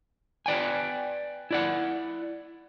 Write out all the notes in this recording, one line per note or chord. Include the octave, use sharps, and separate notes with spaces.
B4 D5 G5 G#5
E4 D5 F#5